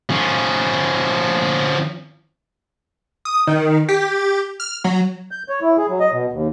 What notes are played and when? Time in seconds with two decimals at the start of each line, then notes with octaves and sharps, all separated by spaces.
0.10 F3 C#4
3.25 D#6
3.47 D#3
3.89 G4
4.60 F6
4.84 F#3
5.31 G6
5.49 C#5
5.62 E4
5.77 G#4
5.89 F#3
6.00 D#5
6.12 B2
6.32 D#2